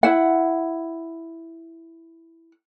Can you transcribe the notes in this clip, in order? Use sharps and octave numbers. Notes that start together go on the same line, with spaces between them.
E4 F#5